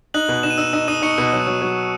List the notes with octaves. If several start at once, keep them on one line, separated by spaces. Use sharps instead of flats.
D#4 F#6 F#7
B2
D#4 E7
D#7
D#4 E6 E7
D#4 E6 E7
D#4 D#6 D#7
D#4 C#6 C#7
B2
F#3
F#3
F#3